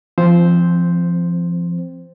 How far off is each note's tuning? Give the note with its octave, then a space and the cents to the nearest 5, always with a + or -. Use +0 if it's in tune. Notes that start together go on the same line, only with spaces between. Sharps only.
F3 -20 C4 +0 C5 +0